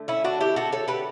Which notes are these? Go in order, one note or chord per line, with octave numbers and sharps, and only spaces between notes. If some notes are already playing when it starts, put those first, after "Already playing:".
Already playing: D3 A3
C#4 E4
D4 F#4
E4 G4
F#4 A4
A4 C#5
G4 B4